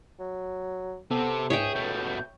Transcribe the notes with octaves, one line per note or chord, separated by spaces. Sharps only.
F#3
C3 B3 C4 A4
C#2 G#2 G#4 C#5 E5 G5
B2 A3 G6